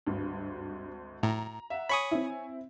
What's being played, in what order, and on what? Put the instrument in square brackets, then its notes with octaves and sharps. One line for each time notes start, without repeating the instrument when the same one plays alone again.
[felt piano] G#1 D2 [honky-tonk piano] G2
[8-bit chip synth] A2 [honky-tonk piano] A#5
[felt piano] E5 F#5
[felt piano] C#5 G#5 [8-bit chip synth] B5 C#6 D#6
[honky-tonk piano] C4 E4